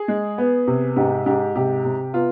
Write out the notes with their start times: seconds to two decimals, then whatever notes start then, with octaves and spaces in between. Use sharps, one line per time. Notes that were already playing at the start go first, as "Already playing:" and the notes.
Already playing: G#4
0.08 G#3
0.38 B3
0.67 C3
0.96 G#2 G4
1.26 G#2 G4
1.55 C3 G4
1.85 C3
2.13 B3 F4